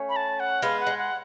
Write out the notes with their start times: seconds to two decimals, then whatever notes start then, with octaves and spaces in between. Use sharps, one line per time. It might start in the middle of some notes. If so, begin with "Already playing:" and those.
Already playing: A3 C#4
0.09 B5
0.16 A5
0.40 F#5
0.62 G#3 B3 F5
0.80 F#5
0.86 G#3
0.98 F#5